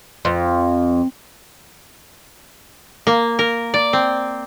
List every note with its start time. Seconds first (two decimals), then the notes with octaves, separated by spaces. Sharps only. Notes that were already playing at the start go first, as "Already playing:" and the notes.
0.25 F2
3.07 A#3
3.39 A#4
3.74 D5
3.93 C4